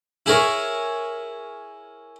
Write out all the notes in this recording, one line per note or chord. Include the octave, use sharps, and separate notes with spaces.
E4 G#4 A#4 C#5